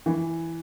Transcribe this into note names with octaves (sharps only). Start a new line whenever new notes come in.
E3